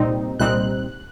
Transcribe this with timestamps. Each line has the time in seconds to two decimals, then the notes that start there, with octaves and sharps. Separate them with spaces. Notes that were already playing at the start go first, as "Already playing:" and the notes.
Already playing: C2 A#2 G3 C4 D#4
0.39 C2 A#2 G3 C4 D#4 F#6